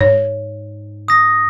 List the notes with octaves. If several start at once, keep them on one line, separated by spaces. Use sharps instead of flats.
G#2 C#5
D#6 A#6